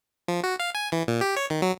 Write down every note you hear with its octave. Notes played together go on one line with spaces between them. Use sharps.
F3
F#4
F5
G#5
E3
A#2
G4
C#5
D#3
F#3